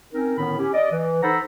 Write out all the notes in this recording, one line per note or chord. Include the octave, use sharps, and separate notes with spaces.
C4 C#4 D#4 A#4
A2 D3 D#3 B3 C#4 B5
C#4 G4
D5 D#5
E3
D#4 A4 C5 F#5 A#5 B5